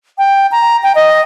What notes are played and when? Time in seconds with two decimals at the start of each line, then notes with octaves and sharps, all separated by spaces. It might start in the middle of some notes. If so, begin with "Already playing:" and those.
0.18 G5
0.52 A#5
0.83 G5
0.95 D#5